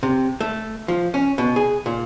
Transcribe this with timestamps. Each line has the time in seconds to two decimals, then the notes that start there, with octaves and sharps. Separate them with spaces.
0.03 C3
0.41 A3
0.88 F3
1.14 C#4
1.38 B2
1.56 G#4
1.86 A#2